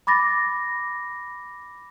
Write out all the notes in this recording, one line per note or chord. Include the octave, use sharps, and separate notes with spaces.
B5 D6 A6 A#6